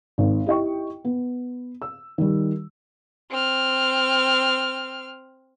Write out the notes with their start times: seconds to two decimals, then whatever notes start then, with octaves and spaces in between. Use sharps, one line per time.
0.18 G#1
0.46 E4 G4 D#5 G5 C#6
1.05 B3
1.82 E6
2.18 D#3 G3
3.31 C4 F6